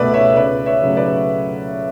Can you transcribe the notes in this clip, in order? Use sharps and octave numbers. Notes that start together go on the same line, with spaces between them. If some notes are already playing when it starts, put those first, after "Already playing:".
Already playing: C#2 B2 A3 B4 D5 E5
C#5 E5
C#2 B4 D5
C#5 E5
C#3 F#3 A3
B4 D5